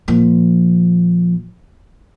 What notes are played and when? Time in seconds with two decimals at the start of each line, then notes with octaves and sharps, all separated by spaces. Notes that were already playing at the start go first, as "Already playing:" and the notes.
0.08 A#2 F3